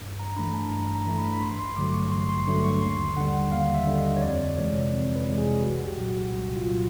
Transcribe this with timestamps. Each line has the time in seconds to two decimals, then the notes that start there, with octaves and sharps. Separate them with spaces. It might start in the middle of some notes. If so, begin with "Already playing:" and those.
0.01 G2
0.19 A#5
0.36 E3 A3 D4 B5
0.54 A5
0.71 G2 A#5
0.95 A#5
1.07 E3 A3 D4
1.18 B5
1.33 B5
1.42 A1 C6
1.59 C6
1.77 G2 D3 F#3 A3 D6
1.94 C#6
2.11 A1 C6
2.29 C6
2.47 G2 D3 F#3 A3 C#6
2.64 C#6
2.82 D#2 C6
3.17 D3 G3 F#5
3.52 D#2 F5
3.75 E5
3.87 D3 G3
3.99 D#5
4.16 C#5
4.22 F2 D5
4.57 C3 E3 G#3 C#5
4.92 F2
5.15 B4
5.27 C3 E3 G#3
5.38 G#4
5.62 C2 F#4
5.85 G4
5.97 A#2 F#3
6.09 F#4
6.32 C2
6.56 F4
6.67 A#2 F#3